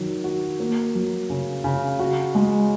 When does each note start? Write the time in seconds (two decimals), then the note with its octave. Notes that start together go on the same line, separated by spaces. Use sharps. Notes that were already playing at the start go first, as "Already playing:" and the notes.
Already playing: D#3 F#3
0.24 F#4
0.60 A#3
0.95 F#3
1.30 C#3
1.64 C#3
1.99 F#4
2.35 G#3